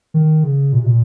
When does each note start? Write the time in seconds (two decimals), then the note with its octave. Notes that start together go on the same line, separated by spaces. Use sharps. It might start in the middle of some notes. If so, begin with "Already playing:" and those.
0.14 D#3
0.44 C#3
0.73 A#2
0.79 C3
0.86 A#2